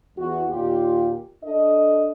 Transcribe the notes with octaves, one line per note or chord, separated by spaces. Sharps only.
E2 F#4
D#2 A#2 F4 G4
D4 A4 D#5